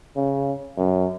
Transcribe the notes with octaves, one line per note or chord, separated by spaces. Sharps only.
C#3
F#2